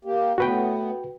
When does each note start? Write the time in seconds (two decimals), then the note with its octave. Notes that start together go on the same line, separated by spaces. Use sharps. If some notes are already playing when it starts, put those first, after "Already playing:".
0.05 A#3 G4
0.38 A2 B3 F#4 B4 G5